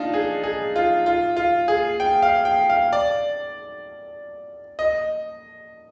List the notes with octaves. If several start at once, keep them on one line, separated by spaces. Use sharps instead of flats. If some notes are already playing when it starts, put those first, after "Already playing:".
Already playing: D4 D#4 F4
G#4
G#4
F4
F4
F4
G#4
G5
F5
G5
F5
D5
D#5